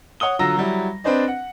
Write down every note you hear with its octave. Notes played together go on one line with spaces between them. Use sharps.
C#5 F#5 D#6 G7
D3 F#3 F4 A#5 E6 A#6
F#3 G3 E4
C4 D4 B4 C5 D5 D#5
F#5